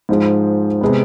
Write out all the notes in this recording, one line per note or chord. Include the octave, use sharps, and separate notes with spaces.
G#2 F3 G#3
C3 G#3 B3